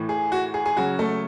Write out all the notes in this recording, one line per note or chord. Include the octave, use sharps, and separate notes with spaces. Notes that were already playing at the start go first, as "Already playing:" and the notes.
Already playing: A2 E3
G#4
F#4
G#4
G#4
C#3 F#3 F#4
A3 A4